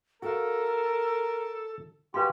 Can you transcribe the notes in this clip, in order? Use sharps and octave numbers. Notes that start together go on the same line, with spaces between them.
F#4 A4 A#4 F5
F#4 G4 B4 F5 G5 G#5 C6